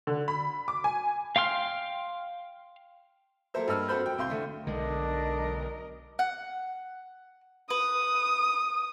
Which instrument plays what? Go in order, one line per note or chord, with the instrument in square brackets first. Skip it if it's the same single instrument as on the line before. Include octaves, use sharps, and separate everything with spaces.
[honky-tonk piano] D3
B5
D6
G#5
[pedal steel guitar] F5 G5 C6 F6
[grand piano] F#3 A#3 A4 A#4 C5 E5
G2 G#3 A#3 E6 F6
C4 F#4 A4 C5 B5 G6
F#3 G5
C2 F5 C6 G6
D3 A3
[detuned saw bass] B1 [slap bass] D3 G#3 [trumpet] D4 [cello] A#4 D#5
[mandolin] F#5
[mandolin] B4 [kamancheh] D#6